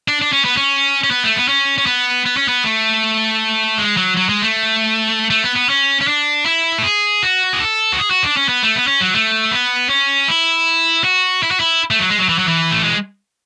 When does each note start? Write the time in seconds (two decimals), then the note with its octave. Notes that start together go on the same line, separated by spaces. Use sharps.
0.08 D4
0.22 D4
0.33 C#4
0.45 B3
0.57 C#4
1.04 C#4
1.11 B3
1.24 A3
1.36 B3
1.48 C#4
1.78 C#4
1.86 B3
2.26 B3
2.37 C#4
2.49 B3
2.64 A3
3.78 G#3
3.97 F#3
4.17 F#3
4.29 G#3
4.42 A3
5.30 A3
5.44 B3
5.56 B3
5.69 C#4
6.01 C#4
6.08 D4
6.46 E4
6.78 A4
6.84 G#4
7.23 F#4
7.53 G#4
7.60 A4
7.92 F#4
7.99 G#4
8.11 F#4
8.24 D4
8.37 C#4
8.49 B3
8.63 A3
8.76 B3
8.87 C#4
9.00 F#3
9.14 A3
9.51 B3
9.90 C#4
10.28 E4
11.04 F#4
11.43 E4
11.51 F#4
11.60 E4
11.91 A3
11.99 F#3
12.10 G#3
12.18 F#3
12.29 E3
12.39 F#3
12.48 E3
12.71 A3
12.84 G#3